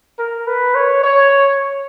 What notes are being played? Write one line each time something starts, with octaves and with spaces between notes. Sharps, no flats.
A#4
B4
C#5
C#5